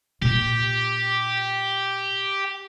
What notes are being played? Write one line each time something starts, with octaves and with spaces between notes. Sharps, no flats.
A#2 F4 G4